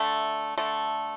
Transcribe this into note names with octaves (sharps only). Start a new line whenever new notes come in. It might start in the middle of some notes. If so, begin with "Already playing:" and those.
Already playing: D3 A3 E5
D3 A3